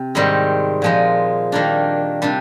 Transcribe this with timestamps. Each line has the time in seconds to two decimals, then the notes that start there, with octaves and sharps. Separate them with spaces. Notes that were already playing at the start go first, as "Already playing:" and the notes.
Already playing: C3
0.15 G#2 D#3 G3 C4
0.82 A#2 F3 G#3 D#4
1.52 D#3 G3 A#3 D4
2.22 C3 G3 D4